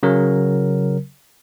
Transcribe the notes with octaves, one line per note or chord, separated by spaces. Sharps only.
C#3 F#3 A#4